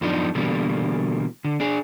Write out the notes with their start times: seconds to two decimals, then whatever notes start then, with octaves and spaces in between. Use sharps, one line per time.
0.01 F#2 F3 B3 D4 D#4
0.35 B2 D3 E3 G3 A#3
1.45 D3
1.60 D4 G#4